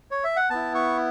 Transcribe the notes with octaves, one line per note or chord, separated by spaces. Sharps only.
C#5
E5
F#5
B3 E4 A5
C#6